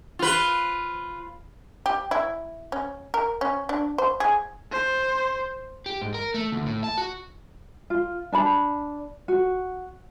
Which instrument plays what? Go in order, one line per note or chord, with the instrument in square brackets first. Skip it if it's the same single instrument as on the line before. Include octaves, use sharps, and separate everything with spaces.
[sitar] F4 B4
[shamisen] G4
E4
C#4
A#4
C#4
D4
C5
G#4
[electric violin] C5
[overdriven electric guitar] G4
G#2
A#4
A3
D2
A2
A5
F#4
[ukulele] F4
D4 A5 B5
F#4